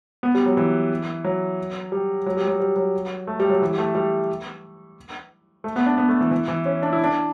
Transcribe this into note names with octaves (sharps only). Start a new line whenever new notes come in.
B3
G3
F#3
E3
F#3
G3
F#3
G3
F#3
G3
F#3
A3
G3
F#3
E3
G3
A3
G3
A3
B3
D4
B3
A3
E3
E3
E3
C#4
D4
E4
D4